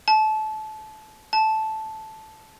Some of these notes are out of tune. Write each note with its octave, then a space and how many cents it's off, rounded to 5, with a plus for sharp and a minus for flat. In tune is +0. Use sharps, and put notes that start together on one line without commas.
A5 -25
A5 -10